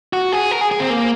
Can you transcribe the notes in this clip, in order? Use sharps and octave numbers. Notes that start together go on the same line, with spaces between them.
F#4
G#4
A#4
G#4
G#4
C4
A#3